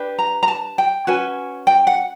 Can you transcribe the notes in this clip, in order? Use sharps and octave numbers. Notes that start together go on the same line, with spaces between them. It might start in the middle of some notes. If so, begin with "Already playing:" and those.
Already playing: D4 G4 B4
A#5
A#5
A5
G5
C#4 F#4 B4 G#5
G5
F#5